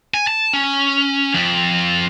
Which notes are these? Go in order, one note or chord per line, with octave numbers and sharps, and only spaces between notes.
G#5
A5
C#4
F2